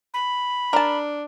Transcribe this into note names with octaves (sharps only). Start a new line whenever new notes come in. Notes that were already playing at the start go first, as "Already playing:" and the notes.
B5
D4 A#4 A5